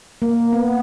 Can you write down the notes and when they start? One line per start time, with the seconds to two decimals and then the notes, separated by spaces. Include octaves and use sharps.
0.22 A#3
0.53 B3